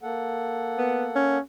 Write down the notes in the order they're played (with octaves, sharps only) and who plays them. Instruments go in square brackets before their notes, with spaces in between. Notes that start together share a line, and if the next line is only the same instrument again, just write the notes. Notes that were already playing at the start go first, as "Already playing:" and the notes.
[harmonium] A#3 A4 F#5
[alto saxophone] B3
C#4